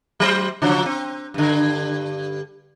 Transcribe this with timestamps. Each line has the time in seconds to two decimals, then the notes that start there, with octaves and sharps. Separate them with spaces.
0.20 F#3 A#4 C5
0.62 C#3 F3 F#3
0.86 C4
1.34 G2 D3